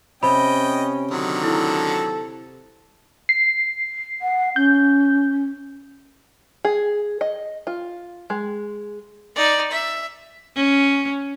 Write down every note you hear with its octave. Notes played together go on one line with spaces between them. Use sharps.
C3 C#4 D#5 G5 B5
D3 D#3 F#3
E4 A4
C7
F#5
C#4 G6
G#4
D#5
F4
G#3
D#4 D5
E5
C#4